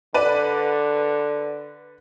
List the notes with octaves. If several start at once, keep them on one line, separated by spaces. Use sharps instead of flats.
D3 B4 D5 D#7